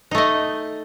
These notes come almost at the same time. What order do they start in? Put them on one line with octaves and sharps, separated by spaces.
D#4 A3 D#5